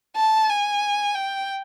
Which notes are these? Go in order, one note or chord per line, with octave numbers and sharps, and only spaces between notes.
A5
G#5
G5